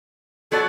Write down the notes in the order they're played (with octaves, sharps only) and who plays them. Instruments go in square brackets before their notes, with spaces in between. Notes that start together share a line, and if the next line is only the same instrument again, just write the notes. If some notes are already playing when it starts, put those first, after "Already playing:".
[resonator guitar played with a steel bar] F#3 B3 F#4 D5 [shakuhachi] A4